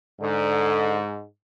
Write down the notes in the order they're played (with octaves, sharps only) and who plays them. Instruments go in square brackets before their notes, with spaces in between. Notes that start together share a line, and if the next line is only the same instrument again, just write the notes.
[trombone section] G#2 [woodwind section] D3